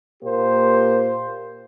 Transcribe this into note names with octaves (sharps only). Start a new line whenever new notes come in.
A#2 A#3 G4 C5